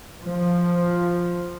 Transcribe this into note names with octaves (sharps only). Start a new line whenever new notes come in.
F3